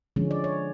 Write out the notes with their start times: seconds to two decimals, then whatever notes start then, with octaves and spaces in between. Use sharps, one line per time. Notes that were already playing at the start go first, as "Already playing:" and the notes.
0.16 D3 F3 G#3 C#4
0.31 D5
0.44 C#5